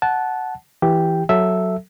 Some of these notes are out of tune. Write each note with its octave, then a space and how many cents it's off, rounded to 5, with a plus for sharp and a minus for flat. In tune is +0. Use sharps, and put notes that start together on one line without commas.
F#5 +0 A5 -15
E3 +0 G4 +0 G5 +0
F#3 +0 A4 +0 E5 +0